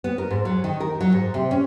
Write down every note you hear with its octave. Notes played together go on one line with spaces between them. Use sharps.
B3
A#4
G#2
F#3
D#3
A#4
F#3
G#2
C3
C#4